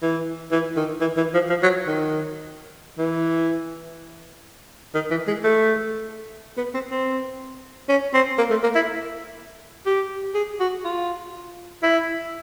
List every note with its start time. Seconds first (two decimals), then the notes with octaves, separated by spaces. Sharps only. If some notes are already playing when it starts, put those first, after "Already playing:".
0.03 E3
0.52 E3
0.77 D#3
1.01 E3
1.17 E3
1.34 F3
1.49 F3
1.63 F#3
1.87 D#3
2.98 E3
4.94 D#3
5.11 E3
5.27 G#3
5.44 A3
6.57 B3
6.74 C4
6.91 C4
7.89 C#4
8.14 C4
8.38 A#3
8.50 A3
8.63 A#3
8.75 E4
9.86 G4
10.35 G#4
10.60 F#4
10.84 F4
11.83 E4